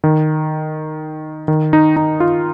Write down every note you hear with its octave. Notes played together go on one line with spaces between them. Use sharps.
D#3
D#3
D#4
D#4
F4